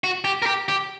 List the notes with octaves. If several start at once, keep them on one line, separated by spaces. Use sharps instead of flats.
F#4
G4
A#4
G4
G4